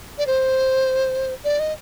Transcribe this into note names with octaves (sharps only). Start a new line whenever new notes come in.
D5
C5
D5
D#5